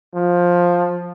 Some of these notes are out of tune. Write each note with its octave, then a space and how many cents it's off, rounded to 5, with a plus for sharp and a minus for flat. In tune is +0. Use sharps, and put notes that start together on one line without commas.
F3 +10